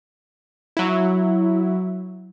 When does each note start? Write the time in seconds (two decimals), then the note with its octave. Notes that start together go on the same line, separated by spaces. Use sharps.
0.77 F#3 E4